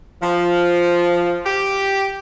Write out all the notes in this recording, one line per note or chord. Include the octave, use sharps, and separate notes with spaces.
F3
G4